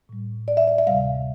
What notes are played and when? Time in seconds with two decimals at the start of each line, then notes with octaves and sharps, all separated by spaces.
0.09 A2 G3
0.48 D5
0.57 E5
0.67 D5
0.78 E5
0.87 D2 C3 G3 F5